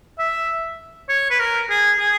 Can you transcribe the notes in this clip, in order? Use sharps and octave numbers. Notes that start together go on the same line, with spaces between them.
E5
C#5
B4
A#4
G#4
G#4